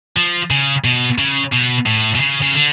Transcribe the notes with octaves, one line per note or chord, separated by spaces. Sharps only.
F3
C#3
B2
C#3
B2
A2
B2
C#3
C#3
D3